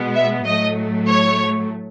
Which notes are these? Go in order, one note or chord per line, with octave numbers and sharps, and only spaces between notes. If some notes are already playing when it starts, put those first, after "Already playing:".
Already playing: B2 G#3 B3
E5
A2 F#3 A3 D#5
C#5